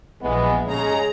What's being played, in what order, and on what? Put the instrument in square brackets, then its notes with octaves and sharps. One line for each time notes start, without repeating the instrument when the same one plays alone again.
[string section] A#1 [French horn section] E3 G#3 B3
[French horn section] C#3 G#3 [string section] G#4 A#5